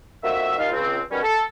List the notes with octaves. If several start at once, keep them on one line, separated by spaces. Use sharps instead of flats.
F2 D#3 A#3 F#4 E5
D#2 D#4 F4 F5
C#2 C4
B2 D#3 G3 B3 C#4
A4